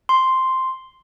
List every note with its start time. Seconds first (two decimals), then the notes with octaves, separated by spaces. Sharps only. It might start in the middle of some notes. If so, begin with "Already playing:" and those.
0.09 C6